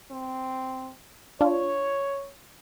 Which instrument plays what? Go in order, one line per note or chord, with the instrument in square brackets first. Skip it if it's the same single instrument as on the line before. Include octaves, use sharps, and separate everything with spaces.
[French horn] C4
[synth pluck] D4 F4 [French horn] C#5